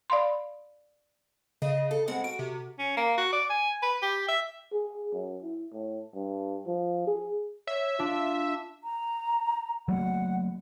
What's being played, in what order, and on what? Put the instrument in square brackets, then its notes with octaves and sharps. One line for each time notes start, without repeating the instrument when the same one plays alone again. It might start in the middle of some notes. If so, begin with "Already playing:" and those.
[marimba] D5 F5 B5 C6
[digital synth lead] C#3 [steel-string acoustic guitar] D#5
[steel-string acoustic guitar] A4
[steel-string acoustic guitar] G2 G#3 C4 [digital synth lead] F#5
[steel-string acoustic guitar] F#4 [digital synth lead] D7
[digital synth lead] C3
[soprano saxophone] C#4
A#3
F#4
D5
G#5
B4
G4
E5
[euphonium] G#4
F#2
E4
A2
G2
F3
G#4
[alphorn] C#5 [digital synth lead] E5
[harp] D4 [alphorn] F4
[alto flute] A#5
[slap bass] F#3 A3 A#3 [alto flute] F#5